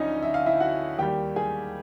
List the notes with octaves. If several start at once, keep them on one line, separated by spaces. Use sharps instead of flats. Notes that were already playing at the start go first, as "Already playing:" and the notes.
Already playing: D2 D3 F3 C#4 D#4 D#5
E5
F5
E4 E5
F#4 F#5
D#2 D#3 G3 G4 G5
G#4 G#5